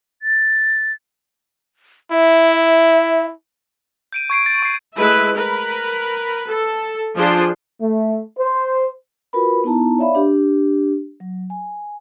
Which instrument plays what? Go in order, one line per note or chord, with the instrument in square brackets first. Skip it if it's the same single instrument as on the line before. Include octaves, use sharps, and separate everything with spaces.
[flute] A6
[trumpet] E4 [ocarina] E5
[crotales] G6 D7 D#7
C#6 G#6 C7 D7
A6
C#6 C7
[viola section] G#3 A3 E4 B4 E5
A#4 B4 B5
A4
F3 D4 F4 G#4 C5 C6
[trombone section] A3
C5
[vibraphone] F4 F#4 A#4 B4 B5
B3 D#4 E4 A5 A#5
C#5 D5 E5 F5 B5
D4 G4
F#3
G#5